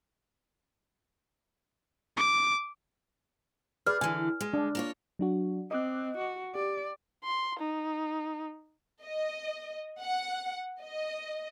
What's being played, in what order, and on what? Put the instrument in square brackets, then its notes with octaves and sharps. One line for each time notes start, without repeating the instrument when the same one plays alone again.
[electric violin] D6
[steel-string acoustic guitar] G#4 [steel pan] B4 D5 [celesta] F6
[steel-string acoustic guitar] D3 E3 [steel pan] G#5
[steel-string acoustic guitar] G#3
[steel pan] D4
[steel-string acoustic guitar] A#3 F4 C#5
[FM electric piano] F#3 D4 F#4
[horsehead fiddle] C4 [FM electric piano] D#5 D6 F#6
[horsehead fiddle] F#4
[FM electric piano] G4 [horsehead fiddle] D5
[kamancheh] C6
D#4
[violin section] D#5
F#5
D#5